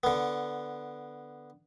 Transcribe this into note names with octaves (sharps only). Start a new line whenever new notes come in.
D3 B3